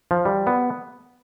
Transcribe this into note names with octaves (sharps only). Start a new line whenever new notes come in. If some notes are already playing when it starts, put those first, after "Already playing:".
F3
G3
B3